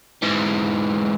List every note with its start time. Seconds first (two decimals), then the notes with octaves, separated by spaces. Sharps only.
0.22 G#2 E3